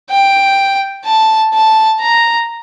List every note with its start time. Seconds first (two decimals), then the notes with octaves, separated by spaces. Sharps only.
0.10 G5
1.05 A5
1.54 A5
2.01 A#5